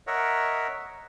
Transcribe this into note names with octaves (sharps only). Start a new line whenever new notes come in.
A#4 C#5 D#5 E5 F#5